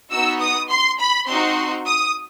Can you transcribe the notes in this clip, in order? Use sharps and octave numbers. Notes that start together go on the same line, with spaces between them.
B3 D#4 F#4 E6
D#6
C6
B5
C4 D#4 F#4 C6
D#6